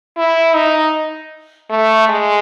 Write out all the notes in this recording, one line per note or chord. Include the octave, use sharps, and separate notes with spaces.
E4
D#4
A3
G#3